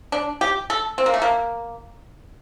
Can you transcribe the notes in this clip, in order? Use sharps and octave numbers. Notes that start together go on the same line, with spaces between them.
D4
G4
A4
C4
A#3
A3
A#3